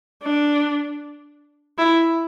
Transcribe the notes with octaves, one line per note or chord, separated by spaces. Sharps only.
D4
E4